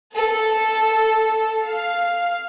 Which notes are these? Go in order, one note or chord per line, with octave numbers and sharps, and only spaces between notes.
A4
F5